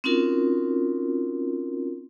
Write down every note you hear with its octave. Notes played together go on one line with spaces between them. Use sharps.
C4 C#4 D#4 F4 F#4 A#4